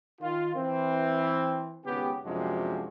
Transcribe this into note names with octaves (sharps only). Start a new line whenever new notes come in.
D#3 F4
E3 C4
G#1 C#3 B3 G4
F#2 C3 F3 G#3 D4 F#4